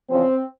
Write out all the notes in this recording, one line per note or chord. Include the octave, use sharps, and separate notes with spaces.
E2 C#3 F3 C4